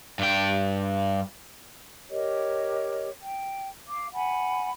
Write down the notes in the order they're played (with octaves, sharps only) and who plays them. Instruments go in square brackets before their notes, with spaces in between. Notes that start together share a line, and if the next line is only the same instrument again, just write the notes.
[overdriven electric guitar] G2 G5
[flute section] G4 A#4 C#5 D#5
G5
F5 D6
F#5 G#5 B5